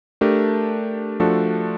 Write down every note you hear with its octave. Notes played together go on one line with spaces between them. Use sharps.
A3 D4 G4 A#4
F3 A3 D4 F#4 A4